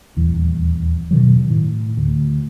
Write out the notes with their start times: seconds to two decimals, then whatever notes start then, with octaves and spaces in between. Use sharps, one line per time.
0.17 D#1 E2
1.11 B2 D#3 F#3
1.50 A2
1.97 D2